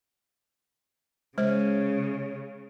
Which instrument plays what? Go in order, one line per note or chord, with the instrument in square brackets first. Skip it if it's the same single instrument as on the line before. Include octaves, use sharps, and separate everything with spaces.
[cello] C#3 [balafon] G#3 C5